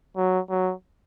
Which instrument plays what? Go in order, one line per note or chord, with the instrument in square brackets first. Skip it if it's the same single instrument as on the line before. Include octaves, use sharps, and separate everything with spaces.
[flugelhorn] F#3
F#3